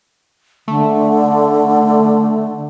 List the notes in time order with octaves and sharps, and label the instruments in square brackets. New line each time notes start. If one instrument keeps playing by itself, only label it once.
[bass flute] D3 [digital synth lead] A3